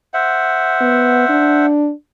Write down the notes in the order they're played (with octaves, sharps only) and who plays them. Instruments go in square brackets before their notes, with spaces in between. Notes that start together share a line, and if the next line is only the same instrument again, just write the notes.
[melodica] C5 E5 F#5
[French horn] B3
D4